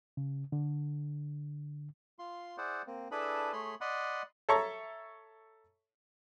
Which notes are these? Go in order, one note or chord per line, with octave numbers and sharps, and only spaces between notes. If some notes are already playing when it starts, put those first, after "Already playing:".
C#3
D3
F4 C6
E4 G#4 C5 D5 F#5
A#3 C4
D4 E4 G#4 A4 B4 B5
A3 G#4 C#5 B5 C6
D5 D#5 F#5 B5 C6
A4 C#5 E5 A#5 C#6